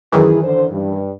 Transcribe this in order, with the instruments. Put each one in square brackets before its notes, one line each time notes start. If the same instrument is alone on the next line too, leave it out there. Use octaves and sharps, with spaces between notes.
[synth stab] F#2 D#3 E3 [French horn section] E4 G#4
[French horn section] D3 C5
G2